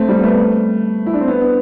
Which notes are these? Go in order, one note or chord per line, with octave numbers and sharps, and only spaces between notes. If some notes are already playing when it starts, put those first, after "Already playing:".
Already playing: A3 C4
G3
B3
A3
E4
D4
C4
B3